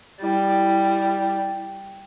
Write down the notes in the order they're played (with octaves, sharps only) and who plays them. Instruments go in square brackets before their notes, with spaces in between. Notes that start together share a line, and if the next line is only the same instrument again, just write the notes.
[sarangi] G3 [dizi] E4